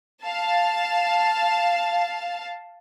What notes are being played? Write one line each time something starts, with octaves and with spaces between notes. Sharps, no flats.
F5 A5